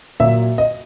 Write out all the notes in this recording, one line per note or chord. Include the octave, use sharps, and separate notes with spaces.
A#2 F#3 E5
D#5